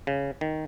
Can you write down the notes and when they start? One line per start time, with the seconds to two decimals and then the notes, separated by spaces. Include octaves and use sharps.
0.07 C#3
0.41 D#3